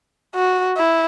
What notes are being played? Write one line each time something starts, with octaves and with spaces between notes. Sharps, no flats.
F#4
E4